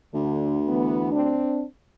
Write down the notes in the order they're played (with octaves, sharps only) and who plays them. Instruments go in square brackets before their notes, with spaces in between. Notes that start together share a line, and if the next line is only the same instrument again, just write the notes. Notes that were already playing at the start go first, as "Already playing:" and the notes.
[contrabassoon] D2 [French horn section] D3
[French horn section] E3 B3
C4 D4